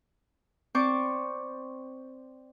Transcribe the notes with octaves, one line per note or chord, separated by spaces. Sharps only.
C4 C5 D5 C#6 D6